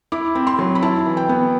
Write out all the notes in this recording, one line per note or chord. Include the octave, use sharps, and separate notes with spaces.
E4 D6
C4
C6
F#3
B5
E4 A5
E3
G5
B3